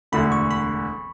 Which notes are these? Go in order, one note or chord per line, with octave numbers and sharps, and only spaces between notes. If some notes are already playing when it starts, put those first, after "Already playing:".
E1 D2 D3 B5
C#6
B5